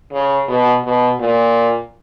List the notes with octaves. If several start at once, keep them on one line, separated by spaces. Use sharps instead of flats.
C#3
B2
B2
A#2